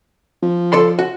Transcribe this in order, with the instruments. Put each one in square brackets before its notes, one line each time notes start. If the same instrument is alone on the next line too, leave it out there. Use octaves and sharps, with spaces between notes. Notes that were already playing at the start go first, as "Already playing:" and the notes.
[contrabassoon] F3
[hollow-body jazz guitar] A4 D5 C6
F#4